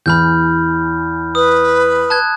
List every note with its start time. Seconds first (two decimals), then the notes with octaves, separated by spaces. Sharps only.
0.06 E2 E3 B5 F6 G6
1.35 B4 D#6
2.10 A5 F#6 G#6